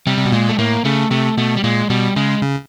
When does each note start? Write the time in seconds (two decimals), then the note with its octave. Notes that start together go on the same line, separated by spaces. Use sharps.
0.07 C3 G3
0.18 C3
0.25 B2
0.32 A#2 G#3
0.49 A3
0.58 A2 A#3
0.85 C#3 A3
1.11 C3 A3
1.37 B2 A3
1.57 G3
1.64 A#2 G#3
1.90 B2 G3
2.16 C#3 G#3
2.42 C#3